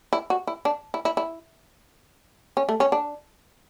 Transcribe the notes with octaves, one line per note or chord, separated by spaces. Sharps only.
E4
F#4
E4
D4
E4
E4
E4
C#4
A3
C#4
D4